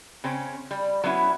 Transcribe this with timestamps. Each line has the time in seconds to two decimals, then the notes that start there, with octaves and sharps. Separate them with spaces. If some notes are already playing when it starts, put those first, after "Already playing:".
0.24 C#3 C4 C#4
0.71 G3
1.04 F#3 B3 C#4 E4